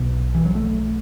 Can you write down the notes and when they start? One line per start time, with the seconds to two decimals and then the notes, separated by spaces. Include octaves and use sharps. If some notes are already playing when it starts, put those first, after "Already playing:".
Already playing: B1 B2 B3
0.35 E3
0.45 F#3
0.55 A3